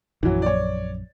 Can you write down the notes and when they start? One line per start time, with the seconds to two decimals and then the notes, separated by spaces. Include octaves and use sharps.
0.23 A#1 F#2 E3 F#3
0.42 C#5 D5